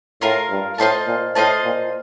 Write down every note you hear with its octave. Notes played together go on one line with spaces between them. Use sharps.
A2 F4 A#4 F5
G2
A2 F4 C5 D#5 A5
A#2
A2 F4 C5 D#5 A5
A#2